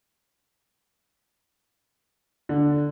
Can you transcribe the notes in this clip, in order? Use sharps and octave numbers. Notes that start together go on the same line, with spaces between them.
D3